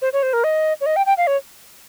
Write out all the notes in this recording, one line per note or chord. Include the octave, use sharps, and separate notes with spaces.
C5
C#5
C5
A#4
D#5
C#5
D#5
G5
G5
F5
C#5